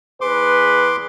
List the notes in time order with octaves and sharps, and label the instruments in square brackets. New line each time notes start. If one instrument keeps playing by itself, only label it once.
[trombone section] E2 G#4 B4 [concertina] C6 D6